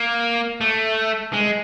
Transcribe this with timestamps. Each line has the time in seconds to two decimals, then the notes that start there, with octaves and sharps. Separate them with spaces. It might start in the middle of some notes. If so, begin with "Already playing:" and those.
Already playing: A#3
0.61 A3
1.33 G#3